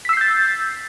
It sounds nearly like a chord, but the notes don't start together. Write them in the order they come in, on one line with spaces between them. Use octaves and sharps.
B6 E6 C7 G6 A6